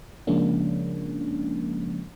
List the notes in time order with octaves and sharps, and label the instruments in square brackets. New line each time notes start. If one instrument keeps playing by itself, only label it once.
[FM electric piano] C#3 F3 G#3 A#3 C#4 D4